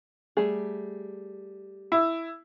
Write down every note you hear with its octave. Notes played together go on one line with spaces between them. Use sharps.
G3 A3 G#4
E4